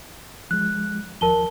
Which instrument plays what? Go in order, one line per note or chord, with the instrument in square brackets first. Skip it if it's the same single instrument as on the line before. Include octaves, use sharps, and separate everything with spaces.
[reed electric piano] F3 G#3 [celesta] F#6
[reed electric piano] D#2 F3 [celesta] A#4 A5 G7